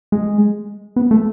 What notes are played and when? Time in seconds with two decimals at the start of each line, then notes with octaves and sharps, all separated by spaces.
0.12 G#3
0.96 B3
1.11 A3